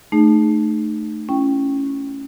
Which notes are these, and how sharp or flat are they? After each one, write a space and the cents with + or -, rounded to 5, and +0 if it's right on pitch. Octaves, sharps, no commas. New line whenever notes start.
A3 +0 D#4 -30 G#4 +0
C#4 +0 E4 +30 G5 +0